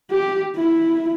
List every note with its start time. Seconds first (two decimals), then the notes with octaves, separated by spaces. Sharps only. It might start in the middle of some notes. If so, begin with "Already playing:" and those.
0.11 G4
0.56 E4